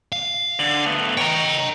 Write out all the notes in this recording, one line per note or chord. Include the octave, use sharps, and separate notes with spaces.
F5
D3
A3 B3
C#5 D#5 G5 A#5